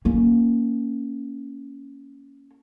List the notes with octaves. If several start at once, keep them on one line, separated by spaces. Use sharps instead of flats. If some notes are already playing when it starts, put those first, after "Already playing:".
A#3 C#4